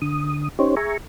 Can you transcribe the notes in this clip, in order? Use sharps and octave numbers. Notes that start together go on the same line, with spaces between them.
D3 D#6
C#4 D#4 G4 C5 C#5
G#4 E5 G#5 A#5 C#6